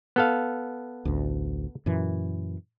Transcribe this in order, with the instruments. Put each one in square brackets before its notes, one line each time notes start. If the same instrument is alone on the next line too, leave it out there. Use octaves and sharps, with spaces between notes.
[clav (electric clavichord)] B3 A4 F5
[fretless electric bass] A1 D2
F#2 A#2 E3